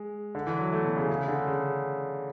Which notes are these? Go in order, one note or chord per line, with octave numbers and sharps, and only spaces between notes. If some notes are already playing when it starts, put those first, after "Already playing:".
Already playing: G#3
D3
E3
F#3
A3
B2
C#3
C#3
D3
C#3